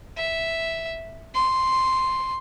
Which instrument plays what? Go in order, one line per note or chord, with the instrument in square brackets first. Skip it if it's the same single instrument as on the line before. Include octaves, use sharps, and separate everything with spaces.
[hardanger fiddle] E5
C6